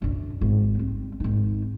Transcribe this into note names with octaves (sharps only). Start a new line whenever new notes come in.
F#2 D3
G#1
G3 C4
G#1 D#4